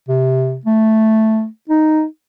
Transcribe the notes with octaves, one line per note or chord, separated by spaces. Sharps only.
C3
A3
D#4